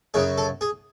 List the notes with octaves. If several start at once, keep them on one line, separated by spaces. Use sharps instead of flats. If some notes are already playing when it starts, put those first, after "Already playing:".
F#2 C#3 F#3 G#4
A4
G#4